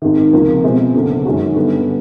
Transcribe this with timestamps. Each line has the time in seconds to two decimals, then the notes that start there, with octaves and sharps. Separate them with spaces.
0.02 G#1 G#2 D#3
0.33 C#2 C3 F3 A#3
0.64 B2 G#3 C4
0.94 F#1 F#2 D3
1.25 F#2 D#3 G#3 C#4 F#4
1.56 G2 D3 G3 B3